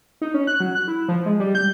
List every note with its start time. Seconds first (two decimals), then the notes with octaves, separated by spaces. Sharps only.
0.21 D#4
0.34 C#4
0.47 F#6
0.60 F#3
0.75 F#6
0.88 E4
1.08 F3
1.26 G#3
1.40 G3
1.55 G6